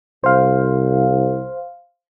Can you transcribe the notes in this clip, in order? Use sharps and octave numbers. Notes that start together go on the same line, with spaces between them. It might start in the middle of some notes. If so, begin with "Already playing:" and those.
C2 C5 F5